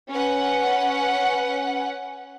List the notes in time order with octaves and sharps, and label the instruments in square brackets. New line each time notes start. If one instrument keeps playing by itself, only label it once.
[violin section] C#4 B4 F#5